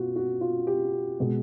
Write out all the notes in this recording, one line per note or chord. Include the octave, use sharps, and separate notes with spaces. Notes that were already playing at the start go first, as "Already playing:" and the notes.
Already playing: B2 F4 F#4
F#4
F4
G4
B2 G#3